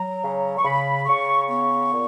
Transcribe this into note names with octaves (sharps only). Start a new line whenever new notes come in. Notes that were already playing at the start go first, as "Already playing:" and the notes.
Already playing: F#3 A#5
C#3
C#6
C#3 B5
C#3 C#6
B3 C#6
A#2